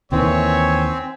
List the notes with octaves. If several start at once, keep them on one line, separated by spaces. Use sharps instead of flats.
D#2 D#3 E3 C4 C#5 E5 G#5